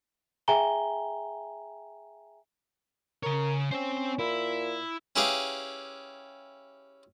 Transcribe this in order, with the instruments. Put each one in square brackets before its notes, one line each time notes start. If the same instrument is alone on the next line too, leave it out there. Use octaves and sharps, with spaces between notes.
[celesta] G#4 E5 G5 G#5 A#5 G7
[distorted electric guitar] C#3 C#5 [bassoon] A#4
[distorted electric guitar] C4 C5 [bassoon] C#4
[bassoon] A#2 [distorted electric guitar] E4
[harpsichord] C#4 E4 G4 G#4 B4 F5